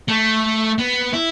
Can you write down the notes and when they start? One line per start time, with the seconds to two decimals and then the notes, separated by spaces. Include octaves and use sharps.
0.08 A3
0.78 B3
1.13 E4